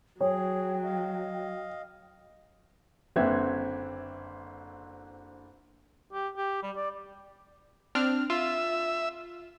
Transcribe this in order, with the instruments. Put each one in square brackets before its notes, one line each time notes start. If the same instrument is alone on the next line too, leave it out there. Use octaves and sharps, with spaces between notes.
[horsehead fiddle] F#3 [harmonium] G#4 [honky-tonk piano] C#5 [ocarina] G5
[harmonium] D#5 F5
[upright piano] F#1 D3 C4 B4 E5 G#6
[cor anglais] G4
G4
G3
D5
[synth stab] C4 D4 F6
[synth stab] F4 [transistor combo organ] E5